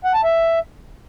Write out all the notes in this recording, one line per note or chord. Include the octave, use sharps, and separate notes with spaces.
F#5
A5
E5